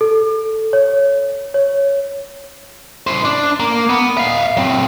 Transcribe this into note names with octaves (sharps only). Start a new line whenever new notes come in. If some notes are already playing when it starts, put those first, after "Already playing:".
A4
C#5
C#5
E4 C5
D4
A#3
B3
E5 F5
F#3 C4